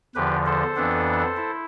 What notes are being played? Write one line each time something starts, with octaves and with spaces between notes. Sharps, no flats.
E2 D3 F3 G4 B4
A4 C5
F2 E3 B3 D4
E4